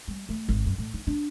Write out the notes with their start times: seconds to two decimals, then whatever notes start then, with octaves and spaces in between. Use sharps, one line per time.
0.08 G3
0.29 A3
0.49 G#1
0.66 F#2
0.78 A2
0.94 D#4
1.07 D4